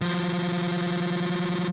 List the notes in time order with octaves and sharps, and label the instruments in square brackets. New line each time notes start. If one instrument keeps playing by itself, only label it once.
[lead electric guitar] F3 F#3